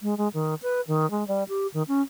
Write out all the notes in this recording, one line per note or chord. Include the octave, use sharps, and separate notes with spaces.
G#3
G#3
D#3
B4
D#3
G#3
G3
G4
D#3
C#4